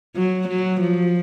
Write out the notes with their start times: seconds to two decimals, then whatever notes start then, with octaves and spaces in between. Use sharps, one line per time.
0.16 F#3
0.49 F#3
0.81 F3